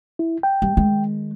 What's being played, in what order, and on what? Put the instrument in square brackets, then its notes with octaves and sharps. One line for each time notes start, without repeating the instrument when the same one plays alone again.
[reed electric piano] E4
G5
[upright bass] G3
D#3 G#3